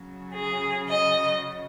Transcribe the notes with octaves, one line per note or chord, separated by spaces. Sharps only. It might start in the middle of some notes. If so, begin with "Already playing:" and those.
Already playing: C#3 F#3
G#4
D#5